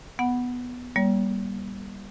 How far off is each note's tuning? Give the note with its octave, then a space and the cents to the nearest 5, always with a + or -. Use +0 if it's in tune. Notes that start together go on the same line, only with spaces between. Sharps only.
B3 +0 F#5 +0
G3 +0 A#3 +40 C#5 +40